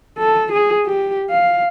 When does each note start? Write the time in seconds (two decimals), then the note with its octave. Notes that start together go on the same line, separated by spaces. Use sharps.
0.18 A4
0.52 G#4
0.85 G4
1.30 F5